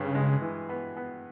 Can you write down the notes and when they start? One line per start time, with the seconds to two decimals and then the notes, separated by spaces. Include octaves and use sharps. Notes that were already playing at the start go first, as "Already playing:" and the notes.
Already playing: G2 C#3
0.15 G#3
0.42 E3
0.69 B3
0.97 B3